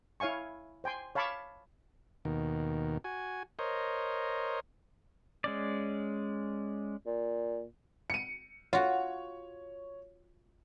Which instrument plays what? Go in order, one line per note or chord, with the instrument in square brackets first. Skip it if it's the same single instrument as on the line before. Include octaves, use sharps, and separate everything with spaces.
[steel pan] E4 C#5 F5 G#5 C#6
C5 G5 G#5 C6
C#5 F5 A5 B5 C#6 D6
[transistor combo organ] D#2 B2 D#3
F#4 G#5
A#4 C5 C#5 D#5
[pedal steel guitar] G#3 C#4 D5
[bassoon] A#2
[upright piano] C#7 D#7
[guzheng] F4 F#4 [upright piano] C#5